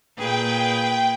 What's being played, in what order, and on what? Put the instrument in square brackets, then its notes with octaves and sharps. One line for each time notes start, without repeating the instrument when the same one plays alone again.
[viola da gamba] A#2 G#4 B4 [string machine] G5